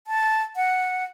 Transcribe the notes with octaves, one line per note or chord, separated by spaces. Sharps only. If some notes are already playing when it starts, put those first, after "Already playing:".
A5
F#5